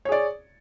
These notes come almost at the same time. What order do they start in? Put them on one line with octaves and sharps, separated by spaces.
C#5 G#4 D5